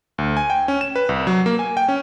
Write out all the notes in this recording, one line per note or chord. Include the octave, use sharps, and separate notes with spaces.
D2
G#5
G5
C#4
E7
B4
C2
F#3
A#3
G#5
G5
C#4